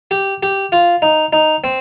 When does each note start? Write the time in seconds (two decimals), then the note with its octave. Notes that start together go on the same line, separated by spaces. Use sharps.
0.11 G4
0.43 G4
0.72 F4
1.02 D#4
1.33 D#4
1.64 C4